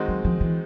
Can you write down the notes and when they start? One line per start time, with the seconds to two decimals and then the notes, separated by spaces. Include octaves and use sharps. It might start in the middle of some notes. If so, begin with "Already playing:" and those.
Already playing: D#3 G#3 C4 D#4 F#4
0.08 F#3
0.25 F3
0.40 E3